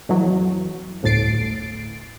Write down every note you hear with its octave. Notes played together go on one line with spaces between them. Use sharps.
F2 E3 F#3
G1 D2 A2 A6 C7 D7